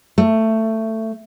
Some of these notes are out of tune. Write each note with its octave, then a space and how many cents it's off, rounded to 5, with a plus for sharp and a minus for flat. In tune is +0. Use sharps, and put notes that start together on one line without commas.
A3 +15